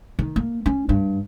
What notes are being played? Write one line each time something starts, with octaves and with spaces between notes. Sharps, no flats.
D#3
A#3
C#4
G2